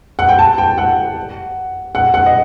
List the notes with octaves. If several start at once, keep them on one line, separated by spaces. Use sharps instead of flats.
F#5
G5
A5
G5
F#5
F#5
F#5
D#5